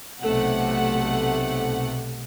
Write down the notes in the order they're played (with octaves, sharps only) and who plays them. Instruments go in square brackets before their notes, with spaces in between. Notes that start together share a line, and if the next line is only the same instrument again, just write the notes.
[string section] B1 C3 A3 F#5